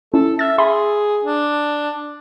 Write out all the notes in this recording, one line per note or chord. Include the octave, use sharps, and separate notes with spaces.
C#4 E4 A4
E5 F6 A6
G#4 E5 B5 C6
D4